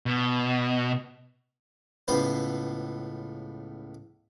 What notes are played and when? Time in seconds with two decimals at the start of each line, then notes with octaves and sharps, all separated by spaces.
0.06 B2
2.08 C#2 A2 B3 B4 C5